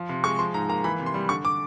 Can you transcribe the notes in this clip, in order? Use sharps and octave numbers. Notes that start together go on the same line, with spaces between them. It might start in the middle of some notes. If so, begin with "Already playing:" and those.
Already playing: F3
C3
G#3 C#6
F3 C6
G#2 A#5
A#3 A#5
E3 B5
C3
C6
G3
D3 C#6
D6